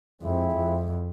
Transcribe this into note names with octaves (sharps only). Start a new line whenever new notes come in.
F2 F3 G#3 C4 E4
F2